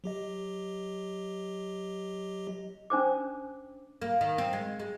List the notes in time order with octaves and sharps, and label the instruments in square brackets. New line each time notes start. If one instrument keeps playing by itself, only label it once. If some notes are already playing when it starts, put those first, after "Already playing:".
[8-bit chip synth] F#3 G4 D#5
[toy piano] C#4 D4 C5 D6
[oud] A#3
D#3
C4
G#3
G#3